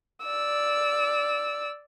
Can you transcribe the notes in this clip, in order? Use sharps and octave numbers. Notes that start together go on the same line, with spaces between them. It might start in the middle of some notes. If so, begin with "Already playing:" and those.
D5 E6